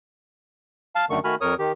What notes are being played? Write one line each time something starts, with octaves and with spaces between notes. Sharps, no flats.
F5 A5
F#2 D3 D#3 A3 C#6
D#3 A3 F#4 G#5 B5 F6
F2 A#4 C#5 D#6
D#3 G4